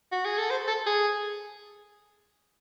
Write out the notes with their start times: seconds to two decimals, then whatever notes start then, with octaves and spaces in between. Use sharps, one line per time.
0.12 F#4
0.25 G#4
0.38 A4
0.51 C5
0.68 A4
0.86 G#4